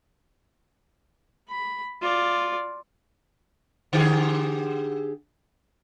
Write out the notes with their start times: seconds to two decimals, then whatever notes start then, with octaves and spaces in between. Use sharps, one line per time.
1.49 B5
2.02 F4 D5
3.93 D3 G4 G#4